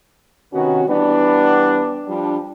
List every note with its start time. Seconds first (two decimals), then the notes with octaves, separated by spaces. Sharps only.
0.52 C3 D#3 B3 C#4 F#4
0.88 E3 G3 B3 D4
2.08 F3 G3 D4